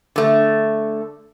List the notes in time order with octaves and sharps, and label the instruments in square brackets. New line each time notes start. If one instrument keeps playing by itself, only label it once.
[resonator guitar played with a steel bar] D3 A3